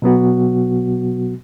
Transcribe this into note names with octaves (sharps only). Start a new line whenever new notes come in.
B2 F#3 B3 F#4